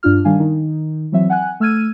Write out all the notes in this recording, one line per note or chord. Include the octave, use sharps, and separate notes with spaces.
G2 D4 F4 F6
D#3 G3 D4 F5 G#5
D#3 D#4
E3 F#3 C4 E5
F#5 G#5 F#6
A3 E6 F6 G#6 D#7